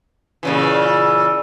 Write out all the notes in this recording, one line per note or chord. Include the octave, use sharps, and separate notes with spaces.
A#2 C#3 E3